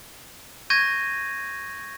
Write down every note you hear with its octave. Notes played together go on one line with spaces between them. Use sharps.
C#6 G6 G#6 A#6 D#7